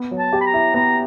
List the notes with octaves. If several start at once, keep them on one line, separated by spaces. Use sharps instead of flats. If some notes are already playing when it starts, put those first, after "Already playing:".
Already playing: B3
F#3
A5
G4
B5
A#5
E4
B3 A#5